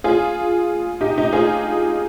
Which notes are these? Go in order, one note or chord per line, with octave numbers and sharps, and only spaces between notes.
F4 G#4
D#4 G4
D#4 G4
F4 G#4